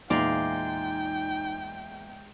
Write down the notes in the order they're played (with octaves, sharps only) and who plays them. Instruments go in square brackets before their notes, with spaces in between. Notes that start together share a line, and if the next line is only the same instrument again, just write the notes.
[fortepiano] E2 A#2 [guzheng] G#3 D5 F5 [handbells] D#4 [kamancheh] G5